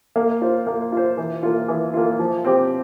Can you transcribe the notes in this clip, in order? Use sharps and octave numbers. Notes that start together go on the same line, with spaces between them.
A#3
F4 C5
A#3
F4 C5
E3
A#3 F4
E3
A#3 F4
F3
C4 G4